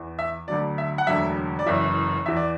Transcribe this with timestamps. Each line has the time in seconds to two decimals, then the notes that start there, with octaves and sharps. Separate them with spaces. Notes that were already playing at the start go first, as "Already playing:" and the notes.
Already playing: E2 E3
0.19 E5
0.48 D2 D3 F#3 D5
0.78 E5
0.98 F#5
1.07 E1 D2 D3 F#3 E5
1.59 D5
1.66 F#1 F#2 E3 E5
2.26 E2 E3 E5
2.37 D5